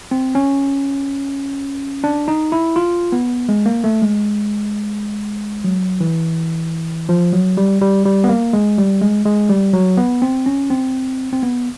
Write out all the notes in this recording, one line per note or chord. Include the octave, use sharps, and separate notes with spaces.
C4
C#4
D4
D#4
E4
F4
B3
G#3
A#3
A3
G#3
F#3
E3
F3
F#3
G3
G3
G3
B3
A#3
G#3
G3
G#3
G#3
G3
F#3
B3
C4
C#4
C4
C4
B3